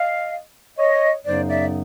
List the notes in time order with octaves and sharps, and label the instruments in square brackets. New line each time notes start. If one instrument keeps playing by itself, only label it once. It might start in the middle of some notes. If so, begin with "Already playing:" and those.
Already playing: [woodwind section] D#5 F5
C#5 D#5
F#2 C#3 F#3 B3 D#4 C5 D5
D5 E5